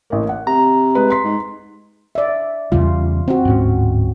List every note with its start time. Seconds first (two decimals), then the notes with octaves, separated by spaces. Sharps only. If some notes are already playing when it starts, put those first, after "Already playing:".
0.10 A1 A#3
0.29 F#5
0.47 C3 A#5
0.95 G#3 B4
1.10 C6 B6
1.24 G#2
2.15 D5 E5
2.72 E2 C#3 G3 F4
3.28 C4 F#4
3.45 D1 G#2 C#4